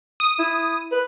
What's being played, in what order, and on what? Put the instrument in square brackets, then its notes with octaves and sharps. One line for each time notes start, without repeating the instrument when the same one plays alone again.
[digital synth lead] D#6
[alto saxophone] E4
B4